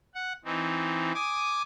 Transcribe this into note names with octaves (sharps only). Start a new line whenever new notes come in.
F#5
E3 C4 D#4
G#5 D6 D#6